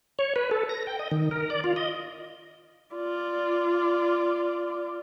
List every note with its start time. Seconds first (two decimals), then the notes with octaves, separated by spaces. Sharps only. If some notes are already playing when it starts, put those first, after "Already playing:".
0.19 C#5
0.36 B4
0.51 A4
0.69 A#6
0.87 G5
0.99 D#5
1.11 D#3
1.31 A#4
1.50 D5
1.64 F4
1.76 D#5
2.95 F4 D5